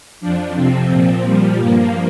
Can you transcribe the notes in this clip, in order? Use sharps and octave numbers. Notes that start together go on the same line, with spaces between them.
F2 F3 D4
F2 C3 F3 C4
A#2 F3
A#2 F3 G3
G2 F3 A#3